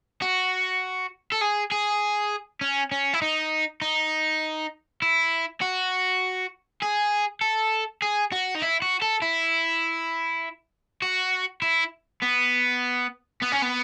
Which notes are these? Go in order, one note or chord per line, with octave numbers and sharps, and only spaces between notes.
F#4
A4
G#4
G#4
C#4
C#4
E4
D#4
D#4
E4
F#4
G#4
A4
G#4
F#4
D#4
E4
F#4
A4
E4
F#4
E4
B3
B3
C#4
B3